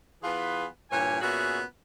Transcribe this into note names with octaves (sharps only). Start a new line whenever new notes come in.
E3 B3 F4 G#4 B4
G2 A#2 E3 C#5 G#5
A#2 B3 C#4 F#4 G#4 E5